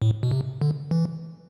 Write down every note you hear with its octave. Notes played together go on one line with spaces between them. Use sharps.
A2
B2
C3
D3
E3